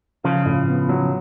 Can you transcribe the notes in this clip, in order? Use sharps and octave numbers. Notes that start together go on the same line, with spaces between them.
C#3 F3 F4
A2
B3
F#3